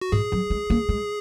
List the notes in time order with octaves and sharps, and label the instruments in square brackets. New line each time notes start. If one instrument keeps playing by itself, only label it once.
[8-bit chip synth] F#4
[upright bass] G#2 [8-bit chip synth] G#4
[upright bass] F#3
G#3
A#3
G#3